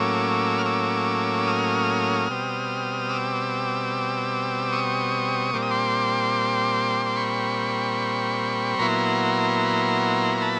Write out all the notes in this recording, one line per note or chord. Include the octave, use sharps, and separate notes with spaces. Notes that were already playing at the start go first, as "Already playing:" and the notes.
Already playing: A2 F#3 A#3 C#4 D6 E6
F6
D6 E6
D#6 F6
B2 G3 C4
D6 E6
C#6 D#6
A#2 G3 C4 D6
D#6
C6 D6
D6
B5 C#6
A#2 F#3 B3 E4 A#5 C6
C6
A5 B5